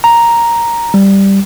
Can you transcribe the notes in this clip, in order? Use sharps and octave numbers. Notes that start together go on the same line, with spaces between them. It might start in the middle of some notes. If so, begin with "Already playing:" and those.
A#5
G3